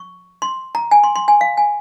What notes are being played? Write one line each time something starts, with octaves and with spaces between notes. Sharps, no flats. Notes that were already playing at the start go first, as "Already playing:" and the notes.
Already playing: C#6
C6
A#5
G#5
C6
C6
G#5
F5
G#5